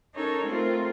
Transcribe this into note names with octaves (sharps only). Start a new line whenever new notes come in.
C#4 D#4 A4 A#4 C#5
A3 C4 F4 A#4